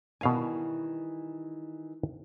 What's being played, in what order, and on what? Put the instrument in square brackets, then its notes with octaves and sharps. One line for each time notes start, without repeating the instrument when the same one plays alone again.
[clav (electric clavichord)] B2 F5 G#5 [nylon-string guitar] D#3 E3 G3